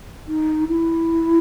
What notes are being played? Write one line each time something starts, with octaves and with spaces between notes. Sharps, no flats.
D#4
E4